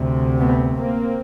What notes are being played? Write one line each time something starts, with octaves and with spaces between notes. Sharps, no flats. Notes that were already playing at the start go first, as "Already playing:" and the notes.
Already playing: D2 C3
A3 B3
A#3 C4